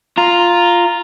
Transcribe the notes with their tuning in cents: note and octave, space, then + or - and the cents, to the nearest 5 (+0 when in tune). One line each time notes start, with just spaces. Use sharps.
F4 +0 A#5 +0